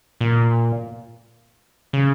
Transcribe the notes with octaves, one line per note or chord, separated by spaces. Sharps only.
A#2
C#3